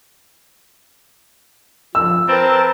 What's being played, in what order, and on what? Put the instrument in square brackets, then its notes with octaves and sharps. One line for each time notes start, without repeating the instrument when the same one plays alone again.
[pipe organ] F3 [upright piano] E6
[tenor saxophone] C4 [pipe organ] A#4 B4 A5